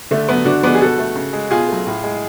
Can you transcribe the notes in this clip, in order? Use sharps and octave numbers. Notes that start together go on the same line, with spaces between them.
D3 A3
F#3 A3 B3
D3 D4 F#4
F3 G#3 B3 D4
G#4
B2 F#4 A4
A3
C#3
G#3
B2 F4 G#4
F#3 A3
A2
G#3